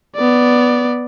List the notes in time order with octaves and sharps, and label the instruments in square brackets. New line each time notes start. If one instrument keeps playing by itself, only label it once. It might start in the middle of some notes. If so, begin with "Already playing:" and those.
[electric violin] B3 D5